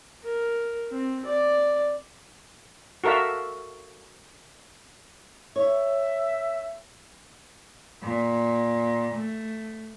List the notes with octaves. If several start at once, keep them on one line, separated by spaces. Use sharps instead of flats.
A#4
C4
D5
F#4 A4 A#4 E5 F5
C#5 E5
A#2
A3